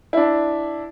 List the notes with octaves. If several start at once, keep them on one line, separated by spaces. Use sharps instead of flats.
D4 E4